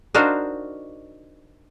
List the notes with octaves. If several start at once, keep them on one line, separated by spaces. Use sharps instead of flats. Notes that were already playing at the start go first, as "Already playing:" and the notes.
D4 D#4 F#4 A#4 C5 F5